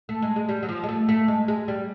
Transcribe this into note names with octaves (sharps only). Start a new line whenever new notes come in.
A3
G#3
G#3
G3
F#3
F3
G#3
A3
A3
G#3
G#3
G3